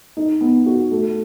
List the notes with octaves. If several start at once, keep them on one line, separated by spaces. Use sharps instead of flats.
D#4
B3
F#4
A3